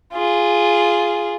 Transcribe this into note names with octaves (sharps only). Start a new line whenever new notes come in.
F4 G#4